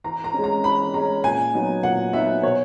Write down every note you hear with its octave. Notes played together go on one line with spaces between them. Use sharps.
E3 A#5
A#5
G#3 C#4
A#5
E3 B5
G#3 C#4 A#5
A#2 G#5
F#3 B3 D#4
A#2 F#5
F#3 B3 D#4 E5
B2 C#5